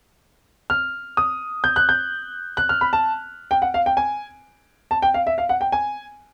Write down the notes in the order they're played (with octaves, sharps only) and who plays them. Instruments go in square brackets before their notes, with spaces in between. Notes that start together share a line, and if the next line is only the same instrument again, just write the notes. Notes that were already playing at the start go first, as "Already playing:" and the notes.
[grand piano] F6
D#6
G6
F#6
G6
F#6
F6
B5
A5
G5
F#5
F5
G5
G#5
A5
G5
F5
E5
F5
F#5
G5
G#5